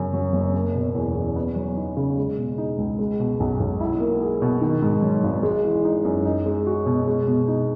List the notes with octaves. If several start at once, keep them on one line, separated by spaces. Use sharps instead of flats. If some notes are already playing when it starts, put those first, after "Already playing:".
Already playing: F#2 C#3
F#3
F#1
A#3
B2
E2
E2
B3
F#3
D#4
C#3
G#3
B2
D#4
C#2
G#3
B2
B1
B1
E4
A#3
G#4
B2
D#3
G#2
F#3
G#1
G#3
E3
D#4
F#2
D#4
G#3
F#4
B2
G#3
B2
D#4